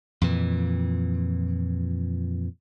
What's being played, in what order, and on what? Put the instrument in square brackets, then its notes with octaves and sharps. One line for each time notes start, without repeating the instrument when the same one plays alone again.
[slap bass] F2 A#2 E3